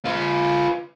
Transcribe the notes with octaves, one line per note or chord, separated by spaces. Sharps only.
F4 B4